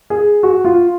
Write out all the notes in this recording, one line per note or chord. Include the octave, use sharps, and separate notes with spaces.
G#4
F#4
F4